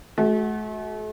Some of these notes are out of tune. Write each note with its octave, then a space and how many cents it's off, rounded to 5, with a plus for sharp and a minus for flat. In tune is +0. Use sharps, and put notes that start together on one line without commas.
A3 -45 F#4 +0